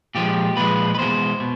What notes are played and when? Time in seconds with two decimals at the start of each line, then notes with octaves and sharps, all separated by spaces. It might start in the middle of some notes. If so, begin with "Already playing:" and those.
0.15 A#2 F3 G#3 G4
0.57 A#2 F3 G#3 B4
0.95 B4
0.98 E2 B2 G#3 C5
1.40 B2